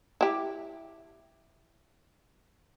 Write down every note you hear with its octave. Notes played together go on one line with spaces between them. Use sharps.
E4 G4